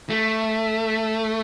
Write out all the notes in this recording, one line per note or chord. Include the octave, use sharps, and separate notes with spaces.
A3